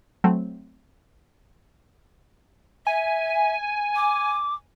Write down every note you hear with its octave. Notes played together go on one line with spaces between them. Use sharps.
F#3 A3 C4
E5 G#5
D6